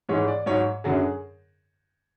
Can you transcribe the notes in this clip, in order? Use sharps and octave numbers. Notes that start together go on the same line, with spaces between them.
G#2 E3 G#3 C#5
D5
G#2 F#3 C#5
F#2 D3 F#3 G#4